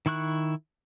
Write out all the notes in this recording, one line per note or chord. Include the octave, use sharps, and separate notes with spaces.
D#3 E4 C#6 F#6